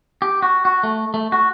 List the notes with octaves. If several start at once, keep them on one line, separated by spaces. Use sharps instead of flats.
G4
F#4
F#4
A3
A3
F#4